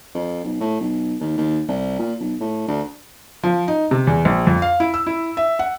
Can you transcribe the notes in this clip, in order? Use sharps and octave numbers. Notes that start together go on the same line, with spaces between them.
F2
B1
A2
B1
D#2
D#2
C2
A#2
B1
A2
D2
F3
D#4
C3
E2
A#1
F2
F5
E4
E6
E4
E5
F#5